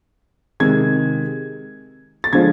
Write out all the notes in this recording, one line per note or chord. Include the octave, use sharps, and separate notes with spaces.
C3 D#3 G#3 G#6
A6
D3 F3 G#3 G#6